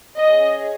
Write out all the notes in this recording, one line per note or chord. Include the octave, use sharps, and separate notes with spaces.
C#4 G#4 D#5